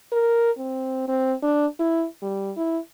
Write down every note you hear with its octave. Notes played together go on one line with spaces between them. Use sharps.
A#4
C4
C4
D4
E4
G3
E4